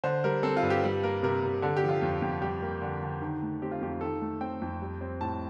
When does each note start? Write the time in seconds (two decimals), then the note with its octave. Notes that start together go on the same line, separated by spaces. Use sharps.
0.04 D3 C5
0.24 G3 A#4
0.43 C4 A4
0.57 F4
0.63 G2
0.70 G4
0.83 G3
1.03 A#3 A#4
1.23 C3 A#4
1.43 C3
1.62 D3 A4
1.77 G4
1.83 F3
1.89 F4
2.02 F2
2.22 F2
2.42 G3 G4
2.62 A#3
2.82 D3
3.03 D3
3.21 D#3
3.42 A3
3.62 C4 G4
3.71 F4
3.81 F2 G4
4.01 D#3 A4
4.21 A3
4.41 C4 G5
4.62 F2
4.82 G3
5.01 C4
5.21 A2 A5